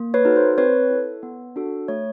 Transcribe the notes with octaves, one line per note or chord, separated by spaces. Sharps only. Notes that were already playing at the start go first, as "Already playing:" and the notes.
Already playing: A#3
B4 C#5
D#4 F#4 A4
C5
C4 B4 C#5
E4 A4
B3
D4 F#4 A4
A3 C#5